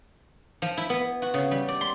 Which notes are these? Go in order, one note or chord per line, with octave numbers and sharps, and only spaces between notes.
F3
E4
B3
F#4
C#3
G3
D5
C6